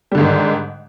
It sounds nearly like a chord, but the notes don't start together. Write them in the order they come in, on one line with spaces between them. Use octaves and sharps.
G3 D3 G#2 D#3